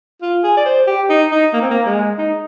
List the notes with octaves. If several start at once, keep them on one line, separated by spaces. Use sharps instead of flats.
F4
G#4
D5
C5
G4
D#4
D#4
A#3
C4
A#3
G#3
D#4